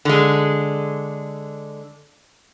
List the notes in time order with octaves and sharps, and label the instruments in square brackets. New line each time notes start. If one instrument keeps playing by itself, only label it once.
[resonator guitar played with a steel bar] D3 G#3